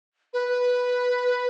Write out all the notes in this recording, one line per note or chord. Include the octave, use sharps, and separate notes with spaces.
B4